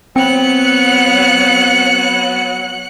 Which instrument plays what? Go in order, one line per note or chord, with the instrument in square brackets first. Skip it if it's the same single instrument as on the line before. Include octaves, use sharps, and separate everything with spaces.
[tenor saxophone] F#3 [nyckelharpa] B3 [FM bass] C4 [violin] F#6 C#7